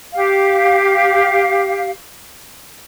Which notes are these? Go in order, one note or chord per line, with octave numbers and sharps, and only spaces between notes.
G4 F5